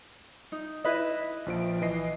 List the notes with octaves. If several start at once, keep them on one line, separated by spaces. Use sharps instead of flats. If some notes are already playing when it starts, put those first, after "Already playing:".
D#4
E4 B4 D#5
A#1 F3 D7
E3 D#5 C7